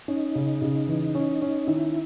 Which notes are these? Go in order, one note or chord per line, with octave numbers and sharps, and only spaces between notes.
C#4 D#4
C#3
C#3
E3
C#4
C#4
D#3 E4